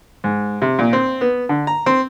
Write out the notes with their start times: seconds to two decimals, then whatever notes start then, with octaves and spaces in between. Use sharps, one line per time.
0.24 G#2
0.62 C3
0.79 A#2
0.93 C4
1.21 B3
1.49 D3
1.67 A#5
1.86 C4